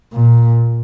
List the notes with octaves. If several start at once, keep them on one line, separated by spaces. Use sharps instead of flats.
A#2